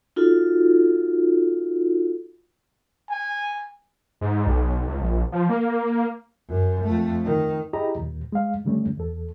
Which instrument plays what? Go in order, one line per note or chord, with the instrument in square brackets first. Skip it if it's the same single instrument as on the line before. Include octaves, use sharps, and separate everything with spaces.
[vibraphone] D#4 F4 F#4 A4
[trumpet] G#5
[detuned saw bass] G#2
B1
C#2
A#1
F3
A#3
[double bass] F#2
F2 A3
D#3
[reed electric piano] E4 G4 G#4 D#5 A#5 B5
D#2 A#2
G#3 F5
A2 D3 G3 A3 C#4
E2 A4